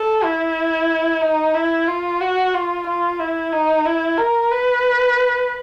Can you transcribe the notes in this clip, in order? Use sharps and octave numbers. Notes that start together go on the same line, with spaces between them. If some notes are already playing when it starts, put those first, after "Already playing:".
Already playing: A4
E4
D#4
E4
F4
F#4
F4
F4
E4
D#4
E4
A#4
B4